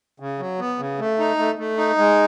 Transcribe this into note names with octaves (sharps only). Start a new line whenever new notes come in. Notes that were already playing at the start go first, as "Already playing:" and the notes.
C#3
F#3
B3
C#3
A3
D#4
A3
A3
D#4
G#3